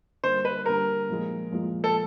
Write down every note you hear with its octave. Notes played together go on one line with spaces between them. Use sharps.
D3 G3 A#3 C5
B4
D3 G3 A#3 A#4
A#2 F3 G#3
A#2 F3 G#3
A4